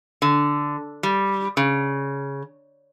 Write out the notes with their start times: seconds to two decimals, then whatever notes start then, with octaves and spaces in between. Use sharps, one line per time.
0.22 D3
1.03 G3
1.57 C#3